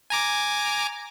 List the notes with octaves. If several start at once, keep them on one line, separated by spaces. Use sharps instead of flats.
G#5 A#5 D6